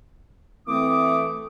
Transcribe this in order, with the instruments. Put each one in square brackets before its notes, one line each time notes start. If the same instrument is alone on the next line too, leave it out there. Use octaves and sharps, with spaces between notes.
[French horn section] E3 A3 [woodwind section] C4 D#6 [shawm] D6